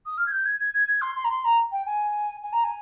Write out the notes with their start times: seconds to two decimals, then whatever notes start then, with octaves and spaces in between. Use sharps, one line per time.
0.06 D#6
0.17 F6
0.26 G#6
0.32 G6
0.45 G#6
0.59 G#6
0.74 G#6
0.88 G#6
1.01 C6
1.15 C6
1.24 A#5
1.30 C6
1.44 A#5
1.71 G5
1.86 G#5
2.43 G#5
2.53 A#5
2.64 G#5